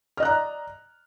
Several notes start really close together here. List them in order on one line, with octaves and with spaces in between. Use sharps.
F6 D#5 F#6 A#5 D5